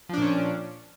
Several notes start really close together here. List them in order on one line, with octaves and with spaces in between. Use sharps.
F3 D4 A#2 C#4